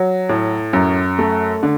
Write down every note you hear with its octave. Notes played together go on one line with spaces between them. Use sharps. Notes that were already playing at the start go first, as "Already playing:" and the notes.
Already playing: F#3
A2
F#2
A3
D3